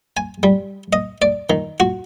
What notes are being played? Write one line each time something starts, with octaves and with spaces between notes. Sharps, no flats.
G#5
G3
D#5
D5
D#3
F#4